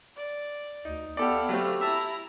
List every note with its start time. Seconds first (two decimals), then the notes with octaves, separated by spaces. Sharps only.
0.17 D5
0.85 D2 D#4
1.17 B3 E4 G4 A4 D5 F5
1.49 F#3 A3 C4 G4
1.81 E4 E5 A5 A#5